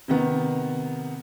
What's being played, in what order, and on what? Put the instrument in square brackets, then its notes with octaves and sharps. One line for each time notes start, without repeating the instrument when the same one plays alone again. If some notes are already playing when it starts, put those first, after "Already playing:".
[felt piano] C3 D#3 B3